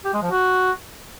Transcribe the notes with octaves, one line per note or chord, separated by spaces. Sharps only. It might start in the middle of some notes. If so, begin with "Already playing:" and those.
G4
G#3
F3
F#4